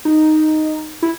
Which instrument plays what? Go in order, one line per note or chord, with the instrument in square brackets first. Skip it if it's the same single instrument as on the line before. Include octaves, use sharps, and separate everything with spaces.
[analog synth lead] D#4
E4